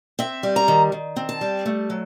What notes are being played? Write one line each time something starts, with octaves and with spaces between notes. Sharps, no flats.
C4 E5
G3
A#5
D#3
D#3
C4
A5
G3
A3
F#3